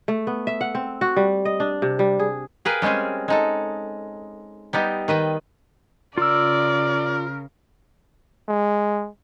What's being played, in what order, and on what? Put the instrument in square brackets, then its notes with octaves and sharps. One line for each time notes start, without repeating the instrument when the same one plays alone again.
[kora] A3
B3
E5
F#5
C4
F#4
G3
D#5
D4
C3
G3
G#4
[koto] G#4 A#4 B4 F5 G5
G3 G#3 C4 C#4 G#4
G#3 D#4 A4
G3 B3 D#4 G4
D#3 B4 D#5 G5
[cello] C#3 [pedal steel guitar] F4 E6 [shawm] A#4 [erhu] D5
[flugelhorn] G#3